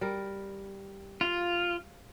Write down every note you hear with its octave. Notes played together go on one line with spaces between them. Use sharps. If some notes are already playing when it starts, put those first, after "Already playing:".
G3 A#4
F4 F5